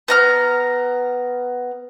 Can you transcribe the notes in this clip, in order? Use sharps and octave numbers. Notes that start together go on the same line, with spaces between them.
B3 A#5 F6